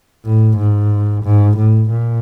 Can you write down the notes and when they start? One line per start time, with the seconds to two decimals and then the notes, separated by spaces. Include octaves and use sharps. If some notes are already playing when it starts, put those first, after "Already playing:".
0.25 A2
0.58 G#2
1.24 G#2
1.57 A2
1.90 A#2